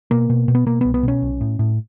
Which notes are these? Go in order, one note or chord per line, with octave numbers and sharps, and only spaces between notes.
B2 A#3
B2
B2
B3
B2 A#3
C2 B3
B3
B2 C#4
B1
A2
A2